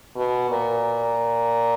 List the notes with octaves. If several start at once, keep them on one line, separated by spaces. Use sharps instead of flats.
B2
A#2